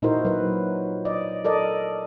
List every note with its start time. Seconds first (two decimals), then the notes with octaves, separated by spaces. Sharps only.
0.02 A#2 D#4 E4 F#4 A#4 C5
0.25 F#3 B4
1.05 D5 D#5
1.45 A4 A#4 D5 D#5